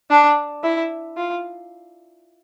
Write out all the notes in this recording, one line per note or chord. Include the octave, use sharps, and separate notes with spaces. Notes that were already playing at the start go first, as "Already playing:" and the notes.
D4
E4
F4